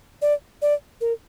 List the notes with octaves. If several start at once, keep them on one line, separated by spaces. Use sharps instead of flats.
D5
D5
A#4